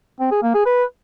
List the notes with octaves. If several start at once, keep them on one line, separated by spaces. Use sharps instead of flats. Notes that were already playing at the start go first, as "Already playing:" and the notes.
C4
G#4
A#3
G#4
B4